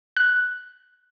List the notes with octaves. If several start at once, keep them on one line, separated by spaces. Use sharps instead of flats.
F#6